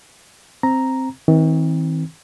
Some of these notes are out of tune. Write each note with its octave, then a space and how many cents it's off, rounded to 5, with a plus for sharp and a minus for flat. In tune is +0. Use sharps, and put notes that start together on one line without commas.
C4 +0 A#5 +0
D#3 +45 C4 +0